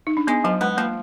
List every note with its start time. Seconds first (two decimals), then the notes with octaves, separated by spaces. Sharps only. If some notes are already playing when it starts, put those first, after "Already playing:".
0.07 D#4
0.17 D4
0.27 G#3 B3
0.44 F3 F#3
0.61 G#3 B3
0.77 F3 A#3